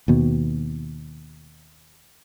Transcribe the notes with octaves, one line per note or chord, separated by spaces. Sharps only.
D#2 B2